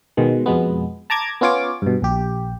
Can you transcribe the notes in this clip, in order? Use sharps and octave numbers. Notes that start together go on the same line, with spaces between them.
B2 D#3 G#3
F2 B2 G#3 B3
A5 A#5 D6 G#6
B3 C#4 F4 C#5 D6
G2 B2
A#1 G4